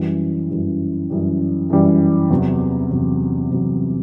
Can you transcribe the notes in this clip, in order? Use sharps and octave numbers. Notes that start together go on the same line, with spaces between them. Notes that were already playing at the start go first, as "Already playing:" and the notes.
Already playing: F#2 E3 G3
F#2 E3 G3
F#2 E3 G3
F#2 E3 G3
E2 C3 F#3
E2 C3 F#3
E2 C3 F#3